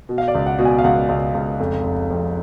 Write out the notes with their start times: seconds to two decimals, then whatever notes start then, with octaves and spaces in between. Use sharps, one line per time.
0.09 B2
0.18 F5
0.28 D5
0.35 C#2
0.46 F#5
0.59 B2
0.65 G#5
0.79 F5
0.84 C#2 F#5
1.09 C#2
1.34 C#2
1.60 F1
1.84 F1
2.10 F2